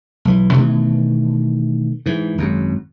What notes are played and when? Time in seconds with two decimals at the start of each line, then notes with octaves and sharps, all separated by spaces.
0.25 B1 E3
0.54 B2 D#3 E3 A3
2.06 G#2 E3
2.38 G#1 F#2